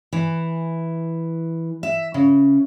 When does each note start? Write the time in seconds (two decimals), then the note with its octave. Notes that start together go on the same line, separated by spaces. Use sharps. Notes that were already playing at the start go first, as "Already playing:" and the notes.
0.13 E3
1.83 E5
2.14 C#3